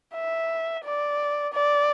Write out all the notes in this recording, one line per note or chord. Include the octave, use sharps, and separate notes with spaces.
E5
D5
D5